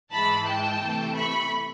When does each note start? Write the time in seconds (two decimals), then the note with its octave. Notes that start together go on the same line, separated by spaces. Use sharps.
0.11 G#2 E3 G#3 A5 B5
0.45 G5 A5
0.81 C3 E3 A3
1.15 B5 C#6